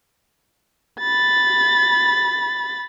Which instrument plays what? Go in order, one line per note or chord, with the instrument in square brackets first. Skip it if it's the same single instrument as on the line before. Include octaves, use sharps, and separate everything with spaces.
[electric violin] B5 A6